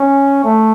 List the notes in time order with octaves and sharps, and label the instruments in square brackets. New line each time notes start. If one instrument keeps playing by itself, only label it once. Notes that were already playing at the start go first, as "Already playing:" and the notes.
Already playing: [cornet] C#4
A3